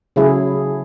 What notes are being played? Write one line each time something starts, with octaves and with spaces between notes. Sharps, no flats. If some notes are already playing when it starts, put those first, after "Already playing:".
C#3 F#3 A3 E4 G#4